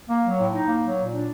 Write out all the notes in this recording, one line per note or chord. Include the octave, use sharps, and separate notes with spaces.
A#3
F#3
A2
D#4
A#3
F#3
A#2
D4